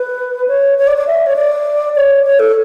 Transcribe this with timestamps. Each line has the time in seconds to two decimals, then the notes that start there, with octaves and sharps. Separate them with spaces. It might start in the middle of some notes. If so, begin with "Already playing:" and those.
Already playing: B4
0.48 C#5
0.78 C#5
0.87 D5
0.97 D5
1.07 E5
1.26 C#5
1.36 D5
1.96 C#5
2.25 C#5
2.39 A4